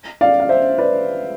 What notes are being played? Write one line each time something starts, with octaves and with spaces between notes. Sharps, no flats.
D5 F5
F5
C5 E5
B4 D5